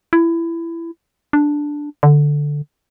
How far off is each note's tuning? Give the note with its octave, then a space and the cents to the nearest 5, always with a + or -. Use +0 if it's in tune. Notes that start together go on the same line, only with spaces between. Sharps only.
E4 +20
D4 +0
D3 +0